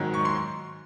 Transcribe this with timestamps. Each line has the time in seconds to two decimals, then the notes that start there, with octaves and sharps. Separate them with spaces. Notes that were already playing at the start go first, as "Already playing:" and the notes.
Already playing: G#2 D#3 F#3
0.14 C#6
0.25 C6